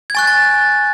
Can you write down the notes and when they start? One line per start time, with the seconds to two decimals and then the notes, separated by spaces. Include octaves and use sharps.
0.10 G#6
0.15 G#5 C#6 F#6 A6
0.27 A6